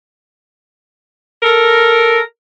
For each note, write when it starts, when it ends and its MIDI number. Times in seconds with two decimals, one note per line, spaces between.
1.43 2.19 69
1.43 2.19 70